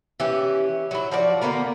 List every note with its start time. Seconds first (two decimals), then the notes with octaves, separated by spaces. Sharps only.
0.20 E3 C#4 G4
0.91 F#3 E4
1.11 F3 F#4 D5
1.41 D3 A#3 B3 A#4